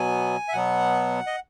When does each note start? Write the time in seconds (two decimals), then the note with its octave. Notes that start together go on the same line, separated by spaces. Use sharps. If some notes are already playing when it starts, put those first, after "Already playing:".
Already playing: B2 F#3 B3 G#5
0.48 E5
0.52 B2 F#3 B3 F#5
1.27 D#5